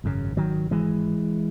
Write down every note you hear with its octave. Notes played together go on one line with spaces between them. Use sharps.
G#1 F#2 C#3
D#3 F#3
E3 G#3